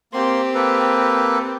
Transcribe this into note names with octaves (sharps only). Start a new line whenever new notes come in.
A#3 C4 G4 C6
A#3 A4 B4